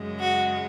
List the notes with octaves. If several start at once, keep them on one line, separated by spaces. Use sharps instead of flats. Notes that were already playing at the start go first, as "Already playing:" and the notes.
Already playing: F#2 C#3 G#3
F#4